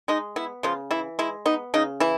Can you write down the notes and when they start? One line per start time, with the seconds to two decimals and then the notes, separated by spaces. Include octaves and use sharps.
0.08 G#3 D#4
0.36 B3 E4
0.63 C#3 F3 F4
0.91 E3 E4
1.19 G#3 E4
1.46 B3 D#4
1.74 C#3 D#4
2.00 E3 E4